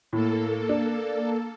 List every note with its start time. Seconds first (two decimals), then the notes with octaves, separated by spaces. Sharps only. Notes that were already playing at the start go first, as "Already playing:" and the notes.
0.13 A2 A#3 A4
0.69 D4